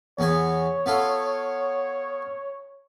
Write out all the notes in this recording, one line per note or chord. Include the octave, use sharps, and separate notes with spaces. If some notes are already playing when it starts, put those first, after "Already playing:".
E2 B3 C#5 G#5
B3 F4 A4